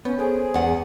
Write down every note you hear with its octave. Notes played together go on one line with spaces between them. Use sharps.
B3 C#4 C#5
G#4 A4 C5 G#5
E2 F#5